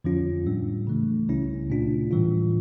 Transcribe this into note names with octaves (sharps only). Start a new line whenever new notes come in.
F2 D3 F3 C#4 F4
A2 G3 D4
C#3 E3 A3
C#2 C#3 G3 C#4 E4
A#2 A3 D4 F4
A2 E3 G3 D4 F4